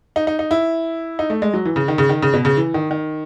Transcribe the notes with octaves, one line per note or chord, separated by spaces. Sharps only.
D#4
D#4
D#4
E4
D#4
A3
G#3
F#3
E3
C#3
D#3
C#3
D#3
C#3
B2
C#3
E3
D#3
D#3